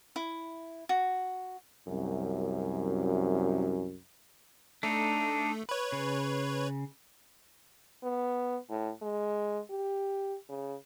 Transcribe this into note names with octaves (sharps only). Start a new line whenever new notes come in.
E4
F#4
C2 F#2
A3 D4 D#4
B4 C#5
C#3
B3
A2
G#3
G4
C#3